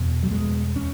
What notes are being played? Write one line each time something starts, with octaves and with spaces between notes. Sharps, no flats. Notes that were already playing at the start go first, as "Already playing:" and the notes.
Already playing: E2 B2
F#3
E2 B2 G#3
C#4